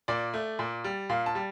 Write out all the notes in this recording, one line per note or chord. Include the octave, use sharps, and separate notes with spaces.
A#2 D5
A3
A#2
G3
A#2 F5
A5
G3